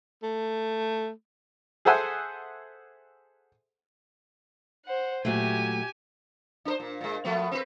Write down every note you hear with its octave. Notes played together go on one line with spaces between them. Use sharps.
A3
G#4 A4 C5 E5 F#5 G#5
C5 F#5
A#2 F#3 A3 G4 G#5
D4 A#4 C5
A#2
A#2 G#3
F3 A3 B3
C4 B4